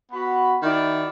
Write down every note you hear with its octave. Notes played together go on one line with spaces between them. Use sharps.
B3 F#4 B5
D#3 E4 F#4 D5